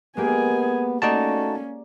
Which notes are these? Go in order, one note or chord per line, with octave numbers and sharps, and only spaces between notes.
G#3 A#3 B3 G4 G#4 G#5
A3 A#3 C#4 D#4 F#4 D5 A5 A#5